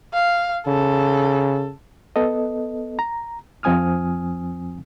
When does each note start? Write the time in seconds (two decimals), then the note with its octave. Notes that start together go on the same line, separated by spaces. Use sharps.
0.13 F5
0.67 C#3 A4
2.16 B3 A4 D#5
2.99 A#5
3.63 F2 F3 C4 G#5 D#6 F6